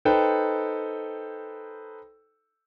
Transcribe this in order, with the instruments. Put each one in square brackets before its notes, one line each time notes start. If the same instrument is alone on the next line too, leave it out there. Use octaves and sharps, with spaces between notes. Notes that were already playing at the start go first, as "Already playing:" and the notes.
[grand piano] D#4 A4 B4 C5 G5